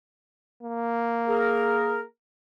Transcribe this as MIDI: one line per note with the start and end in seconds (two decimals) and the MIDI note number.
0.63 2.05 58
1.27 2.01 68
1.27 2.01 70